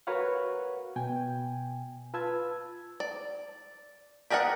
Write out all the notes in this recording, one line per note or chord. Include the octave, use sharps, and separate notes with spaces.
F#4 A#4 B4 C#5 F5 F#5
B2 G5 G#5
F4 B4 A5 E6 G#6
D5
G4 G#4 A#4 D5 F#5